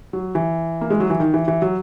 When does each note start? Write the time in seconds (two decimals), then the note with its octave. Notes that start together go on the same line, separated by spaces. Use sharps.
0.13 F#3
0.35 E3
0.81 A#3
0.90 G#3
1.00 F#3
1.10 E3
1.20 D#3
1.34 E3
1.48 E3
1.62 F#3